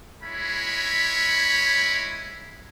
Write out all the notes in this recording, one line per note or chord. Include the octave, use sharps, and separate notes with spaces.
G#3 E4 C#5 B5